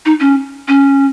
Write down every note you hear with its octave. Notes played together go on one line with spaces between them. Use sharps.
D#4
C#4
C#4